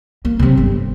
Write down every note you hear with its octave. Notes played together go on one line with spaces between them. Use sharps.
A#3
C3 F#3
G1